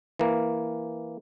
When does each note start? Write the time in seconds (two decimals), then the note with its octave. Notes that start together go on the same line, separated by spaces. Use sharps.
0.19 E3 A#3